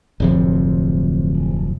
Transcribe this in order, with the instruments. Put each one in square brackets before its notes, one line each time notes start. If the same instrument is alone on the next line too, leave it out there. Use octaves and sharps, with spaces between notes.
[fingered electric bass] D1 F2 C3